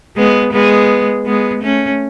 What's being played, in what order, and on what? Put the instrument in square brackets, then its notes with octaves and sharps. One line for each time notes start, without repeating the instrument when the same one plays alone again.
[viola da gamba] G#3 B3
G#3 B3
G#3 B3
A3 C#4